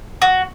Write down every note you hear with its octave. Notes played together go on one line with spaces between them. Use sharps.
F#4